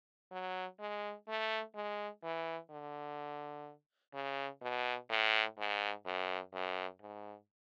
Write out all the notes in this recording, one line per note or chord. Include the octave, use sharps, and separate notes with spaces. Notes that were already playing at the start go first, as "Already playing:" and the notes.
F#3
G#3
A3
G#3
E3
D3
C#3
B2
A2
G#2
F#2
F#2
G#2